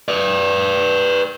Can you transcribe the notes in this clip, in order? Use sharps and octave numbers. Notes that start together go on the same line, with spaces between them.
B4 D5